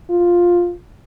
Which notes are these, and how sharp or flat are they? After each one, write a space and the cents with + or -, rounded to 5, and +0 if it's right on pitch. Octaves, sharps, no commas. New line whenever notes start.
F4 +5